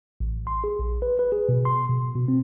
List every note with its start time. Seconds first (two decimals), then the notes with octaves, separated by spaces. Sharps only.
0.20 A1
0.47 C6
0.64 G#4
0.79 A#1
1.02 B4
1.19 B4
1.32 G#4
1.49 B2
1.65 C6
1.90 B2
2.15 B2
2.28 C4